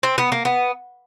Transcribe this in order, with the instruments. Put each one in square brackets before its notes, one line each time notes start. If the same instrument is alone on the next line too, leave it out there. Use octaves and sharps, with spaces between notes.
[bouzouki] C4
B3
A#3
B3